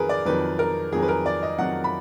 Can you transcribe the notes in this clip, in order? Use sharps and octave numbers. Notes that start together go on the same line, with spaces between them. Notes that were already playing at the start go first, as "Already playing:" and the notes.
Already playing: F2 D#3 F#3 G#4 A#4 B4
D5
F2 D#3 F#3 B4
A#4
F2 D#3 F#3 G#4
B4
A#4
D5
D#5
F2 D#3 F#3 F#5
B5